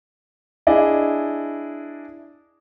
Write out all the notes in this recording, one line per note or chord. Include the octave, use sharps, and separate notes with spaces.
D4 E4 G#4 D5 D#5